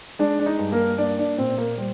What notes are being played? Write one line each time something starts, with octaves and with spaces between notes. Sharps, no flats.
G#3 D4
D4
D#4
G2
A#3 A#4
A#3 D4 D5
D4 D5
A#2 C4 C5
A#3 A#4
G3 C5